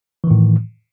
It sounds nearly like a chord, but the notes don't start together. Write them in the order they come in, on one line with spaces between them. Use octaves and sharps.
E3 D#3 A2